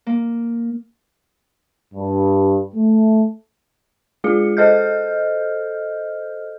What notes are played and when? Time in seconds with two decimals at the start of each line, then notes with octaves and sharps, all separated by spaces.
0.06 A#3
1.94 G2
2.75 A3
4.24 G#3 F4 G#4 C#7
4.57 A4 C5 D#5 F6 G6